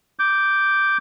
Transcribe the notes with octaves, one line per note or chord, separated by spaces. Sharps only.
D6 G6